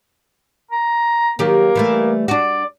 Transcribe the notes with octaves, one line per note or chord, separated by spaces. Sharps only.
A#5
D#3 F#3 A#3 G4
E3 G3 A3
D4 F#4 D5